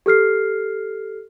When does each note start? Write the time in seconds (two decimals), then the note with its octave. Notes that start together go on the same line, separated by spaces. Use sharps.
0.06 G4 A4 F6 C7